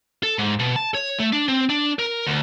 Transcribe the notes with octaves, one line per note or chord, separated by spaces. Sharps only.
A4
G#2
B2
A5
C#5
A3
D4
C4
D4
A#4
D2